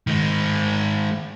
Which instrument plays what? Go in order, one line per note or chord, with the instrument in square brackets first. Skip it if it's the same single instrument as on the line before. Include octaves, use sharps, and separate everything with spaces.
[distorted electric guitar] D#3 G#3